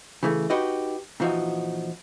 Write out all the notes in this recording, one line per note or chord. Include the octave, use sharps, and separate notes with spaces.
C#3 E3 A3
D#4 F#4 G4 B4 D#5
A#2 E3 F3 D#4 F#4